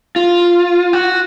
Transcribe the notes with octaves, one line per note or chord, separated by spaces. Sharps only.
F4
F#4